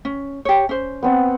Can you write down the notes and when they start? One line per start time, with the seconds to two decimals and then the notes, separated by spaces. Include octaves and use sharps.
0.05 C#4
0.45 G4 C#5
0.69 C#4 C5
1.03 B3 C4 F#5